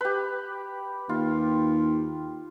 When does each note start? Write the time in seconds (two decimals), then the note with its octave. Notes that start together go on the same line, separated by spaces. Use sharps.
0.01 G4 B4
1.09 D#2 F4